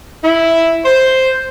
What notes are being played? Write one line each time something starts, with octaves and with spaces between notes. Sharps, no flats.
E4
C5